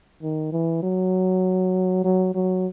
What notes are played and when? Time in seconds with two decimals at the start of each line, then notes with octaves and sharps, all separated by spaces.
0.22 D#3
0.52 E3
0.83 F#3
2.04 F#3
2.35 F#3